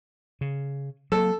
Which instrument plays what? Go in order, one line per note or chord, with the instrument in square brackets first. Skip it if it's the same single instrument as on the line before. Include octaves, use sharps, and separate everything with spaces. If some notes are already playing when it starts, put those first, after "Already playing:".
[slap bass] C#3
[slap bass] F#3 A#3 [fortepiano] A4